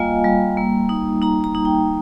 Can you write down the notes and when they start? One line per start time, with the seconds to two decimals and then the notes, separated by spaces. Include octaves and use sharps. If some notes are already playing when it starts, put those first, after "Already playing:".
Already playing: G3 A#3 F4 D#5 F5 G#5
0.24 G3
0.57 A#3
0.89 D#4
1.22 D#4 A#5
1.44 A#5
1.55 D#4
1.65 G5